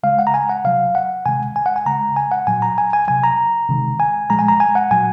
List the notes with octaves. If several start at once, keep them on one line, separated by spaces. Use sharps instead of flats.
C#3 G#3 F5
F#5
A#5
G#5
F#5
C3 F#3 F5
F#5
C3 D#3 G#3 G#5
G#5
F#5
G#5
C#3 G#3 A#5
G#5
F#5
A#2 F#3 G#5
A#5
G#5
G#5
C3 F#3 G#5
A#5
C3 D#3 G#3
G#5
A#2 F3 G#3 A#5
G#5
A#5
G#5
F#5
A#2 F#3 G#5